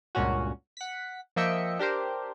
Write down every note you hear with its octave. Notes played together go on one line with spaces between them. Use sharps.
C#2 G2 A#2 C#4 F#4
F#5 B6
F3 A#3 D#5 E5 G5 C#7
D4 G4 A#4 C5